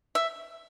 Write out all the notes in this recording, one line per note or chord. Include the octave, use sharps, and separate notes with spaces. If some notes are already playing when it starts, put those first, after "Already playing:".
E5